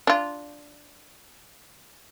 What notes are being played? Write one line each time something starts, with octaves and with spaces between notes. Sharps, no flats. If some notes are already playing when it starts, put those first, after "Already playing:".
D4 F4